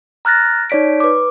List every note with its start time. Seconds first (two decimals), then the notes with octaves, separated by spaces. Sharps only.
0.25 A#5 F6 F#6 A6 A#6
0.70 D#4 C#5 D5 B6 D7
1.00 B4 D6